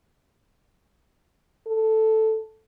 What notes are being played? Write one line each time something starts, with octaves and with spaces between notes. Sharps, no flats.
A4